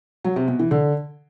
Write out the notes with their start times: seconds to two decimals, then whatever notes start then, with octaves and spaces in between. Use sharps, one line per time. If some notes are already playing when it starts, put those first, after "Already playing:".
0.24 F#3
0.36 C3
0.48 B2
0.59 E3
0.71 D3